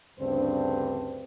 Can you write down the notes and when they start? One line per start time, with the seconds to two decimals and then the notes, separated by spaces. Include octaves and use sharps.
0.20 D2 G2 C#3 C4 D4 C5